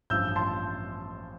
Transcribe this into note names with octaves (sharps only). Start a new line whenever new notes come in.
A1 G2 F3 E6 G6
A5 C6